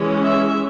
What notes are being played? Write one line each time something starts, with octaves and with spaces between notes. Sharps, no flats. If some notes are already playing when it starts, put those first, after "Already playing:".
Already playing: E3 G#3 C#4
E5